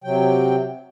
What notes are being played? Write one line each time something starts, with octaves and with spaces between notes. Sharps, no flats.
C3 F#3 G5